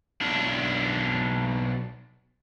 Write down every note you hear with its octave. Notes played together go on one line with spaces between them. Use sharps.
B1 D4